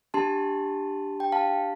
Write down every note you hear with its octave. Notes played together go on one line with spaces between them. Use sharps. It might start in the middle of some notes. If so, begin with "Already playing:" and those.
D4 G4 A5 C6
G5
F5 A5